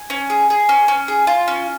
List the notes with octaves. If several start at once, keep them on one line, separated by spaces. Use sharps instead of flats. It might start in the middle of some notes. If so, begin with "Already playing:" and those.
Already playing: G#5
C#4
G#4
G#4
C#4
C#4
G#4
F4
C#4